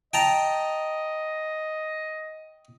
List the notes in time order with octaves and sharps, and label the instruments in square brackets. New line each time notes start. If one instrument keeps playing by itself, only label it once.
[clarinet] D#5 [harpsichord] G5 A5 A#5